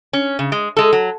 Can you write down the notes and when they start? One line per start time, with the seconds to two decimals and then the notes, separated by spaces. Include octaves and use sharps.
0.13 C#4
0.39 C#3
0.52 G#3
0.77 G#3 A4
0.93 F#3